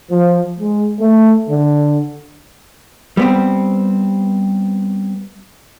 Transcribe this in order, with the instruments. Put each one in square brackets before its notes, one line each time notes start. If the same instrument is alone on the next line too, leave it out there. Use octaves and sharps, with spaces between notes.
[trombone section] F3
G#3
A3
D3
[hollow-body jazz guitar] G3 B3 C4